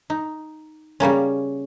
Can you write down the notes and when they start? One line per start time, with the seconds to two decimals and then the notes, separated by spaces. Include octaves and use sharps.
0.10 D#4
1.00 C#3 G3 A#3 C#4